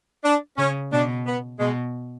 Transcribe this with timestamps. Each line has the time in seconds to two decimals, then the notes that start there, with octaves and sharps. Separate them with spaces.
0.24 D4
0.57 C#3 C#4
0.92 B2 D4
1.26 B3
1.59 B2 G#3